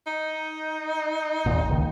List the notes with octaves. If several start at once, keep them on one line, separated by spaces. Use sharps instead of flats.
D#4
G#1 D#2 A#2
C#2 D#3